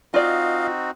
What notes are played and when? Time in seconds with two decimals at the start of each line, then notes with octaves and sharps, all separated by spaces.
0.14 C4 D#4 F4 F#4 D5 D#5 F5